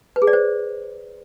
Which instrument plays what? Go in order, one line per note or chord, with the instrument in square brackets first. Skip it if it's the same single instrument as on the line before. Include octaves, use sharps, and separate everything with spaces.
[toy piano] B4
G#4
D5
C5